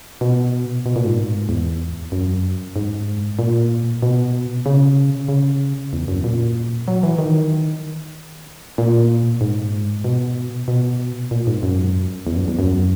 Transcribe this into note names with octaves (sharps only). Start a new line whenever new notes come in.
B2
B2
A#2
G#2
E2
F#2
G#2
A#2
B2
C#3
C#3
E2
F#2
A#2
F#3
E3
D#3
A#2
G#2
B2
B2
A#2
G#2
F#2
E2
F#2
E2
F#2